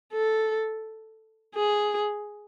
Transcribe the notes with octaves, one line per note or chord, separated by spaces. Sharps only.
A4
G#4